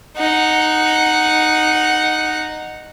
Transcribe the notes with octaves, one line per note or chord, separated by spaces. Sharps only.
D#4 F#5